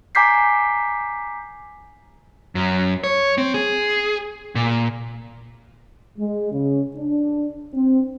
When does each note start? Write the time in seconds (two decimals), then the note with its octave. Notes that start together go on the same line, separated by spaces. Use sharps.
0.15 G#5 A#5 D6 G6 B6 C7
2.55 F#2
3.04 C#5
3.38 C4
3.54 G#4
4.55 A#2
6.17 G#3
6.52 C#3
6.96 D4
7.74 C4